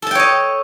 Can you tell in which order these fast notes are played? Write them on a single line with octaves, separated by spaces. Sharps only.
A4 A5 G5 C#5 D#5